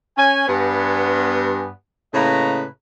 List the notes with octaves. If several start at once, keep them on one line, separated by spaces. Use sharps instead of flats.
C#4 G#5
G2 B3 G#5
A2 C#3 A#3 B4 D#5 A#5